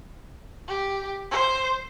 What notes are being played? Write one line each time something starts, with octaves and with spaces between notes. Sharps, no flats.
G4
C5